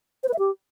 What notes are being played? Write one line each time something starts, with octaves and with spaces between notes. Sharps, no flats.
C5
B4
E5
G4